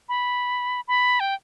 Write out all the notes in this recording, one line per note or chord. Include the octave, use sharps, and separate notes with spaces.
B5
B5
G5